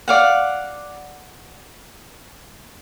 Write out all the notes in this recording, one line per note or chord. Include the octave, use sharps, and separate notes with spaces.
D5 F5 F#5